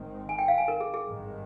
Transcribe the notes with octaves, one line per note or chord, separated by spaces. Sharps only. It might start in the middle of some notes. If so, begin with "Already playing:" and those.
Already playing: G#1 G#2 D#3 G#3 C4
G#5
G5
F5
G#5
A#4
G#4
G#4
G#1 G2 D#3 G#3